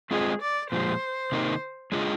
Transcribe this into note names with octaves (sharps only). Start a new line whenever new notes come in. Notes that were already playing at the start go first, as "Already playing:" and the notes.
G#3 C4 F4 G#4 C5 D#5
D5
A#2 F3 G#3 C5
C3 D#3 A#3 D#4
G#3 D4 F4 G#4 D#5